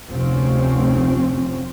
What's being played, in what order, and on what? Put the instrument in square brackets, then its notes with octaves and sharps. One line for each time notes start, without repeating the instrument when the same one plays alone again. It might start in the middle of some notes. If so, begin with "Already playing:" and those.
[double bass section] F1 D2 F3 C4 C#4